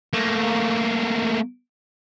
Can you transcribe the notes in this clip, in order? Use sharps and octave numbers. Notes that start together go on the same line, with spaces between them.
A3 A#3